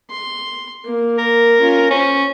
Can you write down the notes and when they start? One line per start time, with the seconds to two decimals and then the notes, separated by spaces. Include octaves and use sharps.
0.10 C6
0.85 A#3
1.18 A#4
1.60 C#4 F4
1.91 C#4 C5